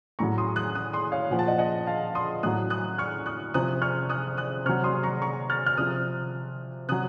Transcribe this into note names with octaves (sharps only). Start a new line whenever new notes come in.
A2 F#3 A#5 C#6
C6 D#6
D#6 F#6
D#6 F#6
C6 D#6
C#5 F5
A#2 F3 F#5
A5
D#5 F#5
D#5 F#5
F5 A5
C6 D#6
A2 F#3 D#6 F#6
D#6 F#6
C#6 F6
D#6 F#6
C3 F3 D#6 F#6
C#6 F6
D#6 F#6
D#6 F#6
C3 F#3 C#6 F6
C6 D#6
A#5 C#6
A#5 C#6
F6 A6
F6
C3 F3 D#6 F#6
C3 F#3 D#6 F#6